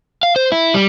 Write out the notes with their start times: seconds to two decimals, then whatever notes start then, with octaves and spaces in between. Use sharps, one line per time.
0.23 F5
0.36 C5
0.52 E4
0.74 G3